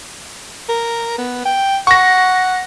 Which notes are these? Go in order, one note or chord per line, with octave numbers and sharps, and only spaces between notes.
A#4
B3
G5
F#5 C#6 A#6